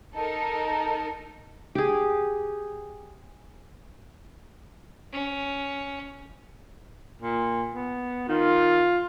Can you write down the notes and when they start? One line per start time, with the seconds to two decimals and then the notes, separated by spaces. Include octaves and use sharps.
0.14 D#4 A4 A#4
1.75 G4 G#4
5.13 C#4
7.22 A#2
7.73 B3
8.28 D#3 F4